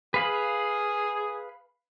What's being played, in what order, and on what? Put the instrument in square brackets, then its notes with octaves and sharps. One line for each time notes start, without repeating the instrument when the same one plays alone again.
[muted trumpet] G#4 [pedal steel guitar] B4 F5 B5